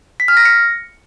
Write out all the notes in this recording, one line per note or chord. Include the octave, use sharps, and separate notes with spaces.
B6
F6
A#6
C#7